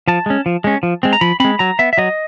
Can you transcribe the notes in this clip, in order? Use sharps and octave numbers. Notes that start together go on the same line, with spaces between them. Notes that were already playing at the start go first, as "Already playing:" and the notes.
F3 A5
G#3 C#4
F3
G#3 C#4
F3
G#3 C4
A#5
F3 B5
G#3 C4 B5
F#3 A#5
B3 E5
E5
F#3 D#5